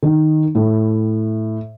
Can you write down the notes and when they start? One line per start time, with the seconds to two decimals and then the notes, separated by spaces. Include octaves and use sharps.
0.03 D#3
0.55 A2